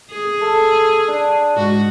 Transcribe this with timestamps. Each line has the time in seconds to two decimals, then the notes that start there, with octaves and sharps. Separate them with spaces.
0.11 G#4
0.42 A4
1.08 D4
1.56 G#2 F#4